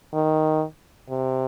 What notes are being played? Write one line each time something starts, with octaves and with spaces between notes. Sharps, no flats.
D#3
C3